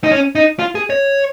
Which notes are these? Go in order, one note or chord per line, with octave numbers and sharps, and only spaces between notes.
D#4
C#4
D#4
F4
G#4
C#5